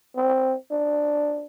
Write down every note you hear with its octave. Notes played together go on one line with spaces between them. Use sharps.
C4
D4